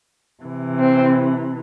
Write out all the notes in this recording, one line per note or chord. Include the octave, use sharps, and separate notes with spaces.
C3 E3
C4